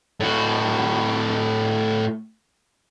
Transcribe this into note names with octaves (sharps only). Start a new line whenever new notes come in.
A2 F#4